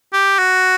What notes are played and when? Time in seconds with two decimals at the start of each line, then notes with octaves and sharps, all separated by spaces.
0.13 G4
0.39 F#4